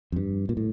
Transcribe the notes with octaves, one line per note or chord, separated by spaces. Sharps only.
F2
G2
A#2
A2